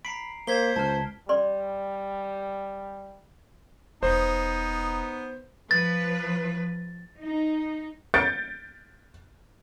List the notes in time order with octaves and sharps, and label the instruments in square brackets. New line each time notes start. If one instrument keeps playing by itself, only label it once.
[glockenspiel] A#5 C7 D7 [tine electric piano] B5
[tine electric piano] A#3 [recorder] C5 [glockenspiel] G#6 B6 G7
[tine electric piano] C#2 [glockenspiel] A5 F6
[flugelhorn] G3 [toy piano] D5 C6
[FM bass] E1 [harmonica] B3 D#4 [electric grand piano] C5
[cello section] F3 B4 [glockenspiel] A6
[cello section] D#4
[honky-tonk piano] G6 A6 C#7 D7